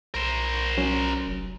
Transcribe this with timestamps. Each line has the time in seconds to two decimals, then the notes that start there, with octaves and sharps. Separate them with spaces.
0.14 B1 A#4 C5
0.77 F#3 C#4
1.26 F1